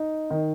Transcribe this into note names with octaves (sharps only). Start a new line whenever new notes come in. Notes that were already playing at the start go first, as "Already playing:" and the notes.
Already playing: D#4
D#3